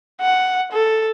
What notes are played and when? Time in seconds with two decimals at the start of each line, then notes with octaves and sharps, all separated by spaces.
0.21 F#5
0.72 A4